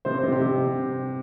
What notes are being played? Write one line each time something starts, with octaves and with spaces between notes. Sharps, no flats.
C3 C5
C3 C5
G4
C3